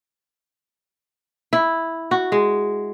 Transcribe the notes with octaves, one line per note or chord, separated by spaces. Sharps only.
E4
F#4
G#3